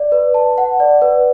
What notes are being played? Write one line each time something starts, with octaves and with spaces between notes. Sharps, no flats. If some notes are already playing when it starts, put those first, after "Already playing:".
Already playing: D5
B4
A5
F#5
D5
B4